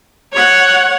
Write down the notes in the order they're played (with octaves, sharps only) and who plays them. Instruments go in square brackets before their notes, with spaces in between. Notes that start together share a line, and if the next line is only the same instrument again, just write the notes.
[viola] C#5 F#5